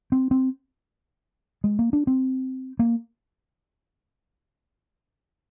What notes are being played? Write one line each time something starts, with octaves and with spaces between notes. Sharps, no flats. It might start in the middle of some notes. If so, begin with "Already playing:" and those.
C4
C4
G#3
A#3
D4
C4
A#3